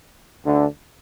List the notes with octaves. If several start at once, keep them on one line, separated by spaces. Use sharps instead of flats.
D2 D3